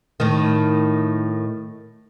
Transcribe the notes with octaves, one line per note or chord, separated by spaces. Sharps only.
A2 D#3